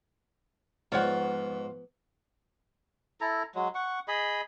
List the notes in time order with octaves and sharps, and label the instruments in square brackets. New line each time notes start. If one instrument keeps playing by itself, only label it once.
[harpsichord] G#2 [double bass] F3 B3 [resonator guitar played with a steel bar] F4 C#5 F#5
[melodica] E4 A4 A#5
F#3 G#3
F#5 C#6
G#4 D#5 B5